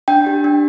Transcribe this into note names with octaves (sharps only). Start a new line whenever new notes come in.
D4 G5
G4
D4